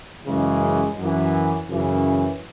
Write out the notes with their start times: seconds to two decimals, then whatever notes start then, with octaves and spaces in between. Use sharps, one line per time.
0.24 F#2 C#3 E3 G#3
0.97 F#2 E3
1.68 F#2 C#3 E3